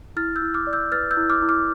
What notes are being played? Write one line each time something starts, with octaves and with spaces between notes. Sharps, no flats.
E4 F6 A6
E6 G6
E4
D6 F6
D5
E6 G6
B4 F6 A6
E6 G6
E4
D6 F6
E4
D6 F6